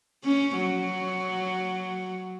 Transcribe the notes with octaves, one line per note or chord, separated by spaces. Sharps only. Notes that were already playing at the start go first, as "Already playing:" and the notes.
C#4
F#3